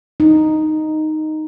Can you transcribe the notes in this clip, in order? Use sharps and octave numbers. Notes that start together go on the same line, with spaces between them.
D#4